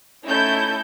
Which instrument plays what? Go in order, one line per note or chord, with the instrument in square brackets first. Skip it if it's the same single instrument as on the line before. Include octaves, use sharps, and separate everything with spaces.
[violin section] A3 C#4 D#4 E4 A4 G6